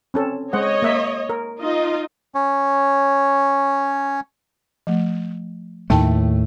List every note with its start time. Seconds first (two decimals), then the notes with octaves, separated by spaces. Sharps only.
0.14 C4 C#4 A4
0.53 G#3 C5 C#5 D#5 F#5
0.82 A#3 E5
1.29 A#4
1.60 D#4 F4 D#5
2.35 C#4 C#5
4.87 F3 A3
5.90 D#2 A2 A3 D#4 G5 A5